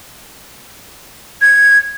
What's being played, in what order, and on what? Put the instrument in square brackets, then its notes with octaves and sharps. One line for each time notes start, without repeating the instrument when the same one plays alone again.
[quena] G#6